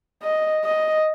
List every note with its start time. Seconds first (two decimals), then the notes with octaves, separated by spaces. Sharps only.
0.23 D#5
0.64 D#5